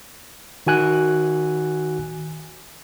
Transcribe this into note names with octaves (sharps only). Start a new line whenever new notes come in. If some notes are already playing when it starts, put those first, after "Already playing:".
D#3 F#4 G#5 F#6